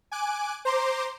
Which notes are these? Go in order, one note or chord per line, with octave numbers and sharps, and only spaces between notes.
G#5 D6 F#6 D7
C5 A#5 C6 D6